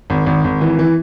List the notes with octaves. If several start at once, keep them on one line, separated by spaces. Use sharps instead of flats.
G#1
G#1
G#1
E3
E3